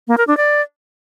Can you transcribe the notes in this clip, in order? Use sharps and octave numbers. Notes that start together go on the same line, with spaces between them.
A#3
A#4
D4
D5